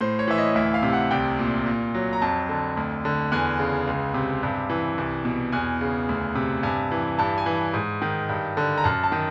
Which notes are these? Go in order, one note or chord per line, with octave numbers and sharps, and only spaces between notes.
A2 C5
C#5
E3 E5
D#5
D2 E5
F5
C3
F#5
C2 G5
A#2
A#2
F#3
A#5
F2 A5
D3
D2
D3
E2 G#5
C#3
C#2
C3
G2
E3
C2
B2
E2 G#5
C#3
D2
C3
G2 G#5
E3
G2 A5
G#5
E3
G#2
D#3
G2
D3
A#5
F#2 A5
A5
D#3